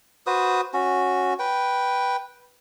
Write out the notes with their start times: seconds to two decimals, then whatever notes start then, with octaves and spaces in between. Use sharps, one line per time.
0.27 F#4 B4 C5 D#6
0.74 C#4 F#4
1.39 B4 G5